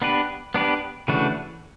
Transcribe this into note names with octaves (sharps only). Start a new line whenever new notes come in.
B3 D4 G4 B4
B3 D4 G4 B4
C#3 E3 A3 D4 F#4